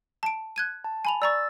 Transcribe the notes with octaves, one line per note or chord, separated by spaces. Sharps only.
A5 D7
F#6 G#6 D#7
A5
G#5 B5 F7
D5 A#5 C#6 E6 A6